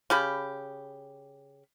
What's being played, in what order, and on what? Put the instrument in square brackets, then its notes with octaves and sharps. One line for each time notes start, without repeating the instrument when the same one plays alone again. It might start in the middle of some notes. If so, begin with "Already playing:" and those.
[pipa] C#3 G4 B5